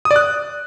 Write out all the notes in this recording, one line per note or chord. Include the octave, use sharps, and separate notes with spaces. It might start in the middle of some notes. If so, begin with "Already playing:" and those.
D#6
D5
F#6